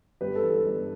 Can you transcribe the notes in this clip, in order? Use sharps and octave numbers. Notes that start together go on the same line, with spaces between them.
G1 G4 B4
A4
G2 E3
A4
G1